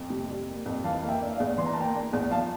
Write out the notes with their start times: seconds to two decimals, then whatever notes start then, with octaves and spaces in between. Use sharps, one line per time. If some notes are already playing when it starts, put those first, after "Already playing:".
Already playing: F2
0.10 C3
0.30 G3
0.48 A#3
0.66 F2
0.84 E3 F5 A5
1.02 A#3 F5
1.08 E5 G5
1.21 D4
1.33 D5 F5
1.40 E2
1.58 E3 C6
1.66 A#5
1.73 A5
1.77 A#3 G5 A#5
1.94 D4
2.13 E2
2.31 F3 F5 A5